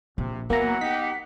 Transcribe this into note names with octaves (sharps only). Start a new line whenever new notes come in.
A#1 C3
E3 F#3 A#3 B3 F#5 A#5
D#4 G4 B6